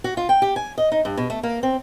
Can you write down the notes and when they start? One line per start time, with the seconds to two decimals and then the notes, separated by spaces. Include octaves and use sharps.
0.04 F#4
0.17 F4
0.29 G5
0.42 G4
0.56 G#5
0.78 D#5
0.92 D#4
1.05 G2
1.17 B2
1.30 A3
1.43 A#3
1.63 C4